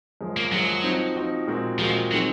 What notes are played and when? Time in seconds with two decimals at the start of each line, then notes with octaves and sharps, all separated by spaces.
0.21 F#2 F3 G#3
0.37 A#3
0.52 F#2 F3 F#3 G#3
0.83 F3 C4 D#4 F#4
1.16 F3 C4 D#4 F#4
1.47 A#2 G#3 C4 F#4
1.79 A#2 F3 G#3 C4 F#4
2.11 D#3 F#3 G#3 C4